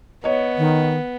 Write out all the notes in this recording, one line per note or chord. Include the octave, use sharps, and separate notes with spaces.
B3 C#5 D#5
D#3